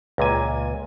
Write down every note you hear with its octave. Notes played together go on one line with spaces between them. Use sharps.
C#2 A#2 G#5